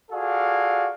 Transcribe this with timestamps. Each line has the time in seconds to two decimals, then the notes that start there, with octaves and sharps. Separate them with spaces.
0.11 F4 F#4 G#4 A4 D5 F5